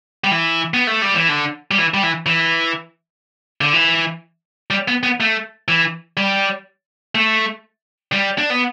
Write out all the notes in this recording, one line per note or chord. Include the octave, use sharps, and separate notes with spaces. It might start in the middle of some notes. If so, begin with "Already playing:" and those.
G3
E3
B3
A3
G3
E3
D3
G3
E3
G3
E3
E3
D3
E3
G3
B3
B3
A3
E3
G3
A3
G3
D4
B3